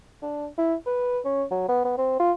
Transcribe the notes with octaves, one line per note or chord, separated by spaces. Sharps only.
D4
E4
B4
C#4
F#3
B3
B3
C4
F4